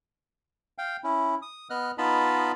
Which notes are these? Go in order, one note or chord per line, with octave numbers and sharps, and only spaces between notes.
F5 G5
C#4 E4
D#6
B3 D#5 F6 F#6
B3 D#4 F4 D#5 A5 B5